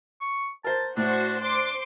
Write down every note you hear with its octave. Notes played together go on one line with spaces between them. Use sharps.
C#6
A#4 C5 A5
A2 D4 F#4 C5
D4 C5 C6 D6